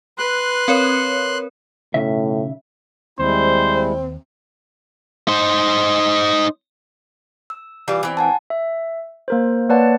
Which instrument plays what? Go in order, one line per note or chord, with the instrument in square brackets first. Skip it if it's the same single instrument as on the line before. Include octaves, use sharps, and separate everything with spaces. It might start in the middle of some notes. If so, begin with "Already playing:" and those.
[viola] B4 [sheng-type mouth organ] C6 F#6
[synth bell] C4 A#4 C#5
[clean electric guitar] B1 C#3 E5 [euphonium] A2
[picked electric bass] D#2 [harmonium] G3 G#3 E4 [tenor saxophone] C4 [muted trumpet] C5
[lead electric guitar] D#4 C5
[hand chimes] E6
[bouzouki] E3 G3 F4
E3 C4
[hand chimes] F#5 G#5 A5
[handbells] E5
A#3 A#4 C5
A#3 B4 C#5 D5 F#5 A5